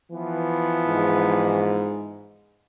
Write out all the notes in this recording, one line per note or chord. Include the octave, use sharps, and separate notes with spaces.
E3 F3 B3
G#2